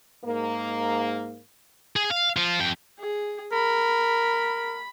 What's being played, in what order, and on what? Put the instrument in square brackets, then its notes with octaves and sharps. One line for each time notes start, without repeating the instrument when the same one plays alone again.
[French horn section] G#2 A#3
[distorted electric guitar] G#4
F5
F3 F4
F2 G5
[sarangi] G#4
[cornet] A#4 [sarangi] B5